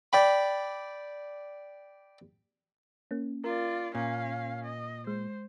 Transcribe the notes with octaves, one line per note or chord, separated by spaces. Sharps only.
D5 G5 B5
A#3 C#4
F4 A#4 D5
A#2 C#4 F5
D#5
G#3 C5